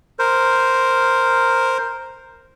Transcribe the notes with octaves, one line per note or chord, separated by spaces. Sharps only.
A#4 C5